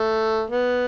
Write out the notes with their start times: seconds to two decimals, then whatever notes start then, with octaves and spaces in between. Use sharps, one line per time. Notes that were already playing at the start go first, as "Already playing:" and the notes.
Already playing: A3
0.50 B3